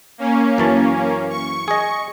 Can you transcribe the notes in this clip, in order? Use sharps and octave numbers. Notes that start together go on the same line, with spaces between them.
A#3 C#4
F#2 E3 A5
C#6
G#4 D#5